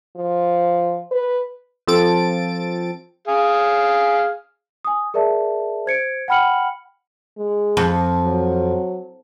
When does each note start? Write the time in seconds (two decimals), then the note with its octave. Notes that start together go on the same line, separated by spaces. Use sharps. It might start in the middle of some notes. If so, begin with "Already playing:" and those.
0.16 F3
1.11 B4
1.87 F3 C4 A4 A6 D7
3.28 G#4 F5
4.85 G#5 D#6
5.14 G#4 A#4 D5 E5 A5
5.86 C5 G#6 C#7 D7
6.28 F#5 G5 B5 F6 C#7 F#7
7.38 G#3
7.77 F2
8.23 F#3